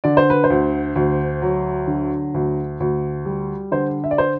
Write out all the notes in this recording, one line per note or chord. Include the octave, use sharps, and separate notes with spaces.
D3 D5
C5
B4
C5
D2
D2
F#3
D3
D2
D2
G3
D3 C5
E5
D5
C5